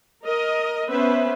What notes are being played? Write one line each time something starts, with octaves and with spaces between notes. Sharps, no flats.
A#4 D#5
B3 C#4 B4 C5 E5